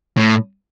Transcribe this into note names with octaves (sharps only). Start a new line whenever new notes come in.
A2